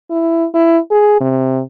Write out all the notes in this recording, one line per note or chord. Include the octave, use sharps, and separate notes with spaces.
E4
E4
G#4
C3